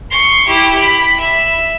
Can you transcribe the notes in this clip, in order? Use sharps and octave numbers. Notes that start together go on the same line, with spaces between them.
C6 C#6
E4 G4
B5
E5